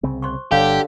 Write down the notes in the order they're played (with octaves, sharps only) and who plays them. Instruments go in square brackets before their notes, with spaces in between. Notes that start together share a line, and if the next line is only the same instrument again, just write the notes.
[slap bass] C2 C#3 C4
[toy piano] C5 C6 C#6
[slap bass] G1 [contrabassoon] D3 [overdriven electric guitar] G4 [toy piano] C#5 F5